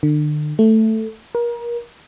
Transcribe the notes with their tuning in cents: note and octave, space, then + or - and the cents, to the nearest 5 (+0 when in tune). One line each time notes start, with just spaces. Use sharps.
D3 +40
A3 +5
A#4 +30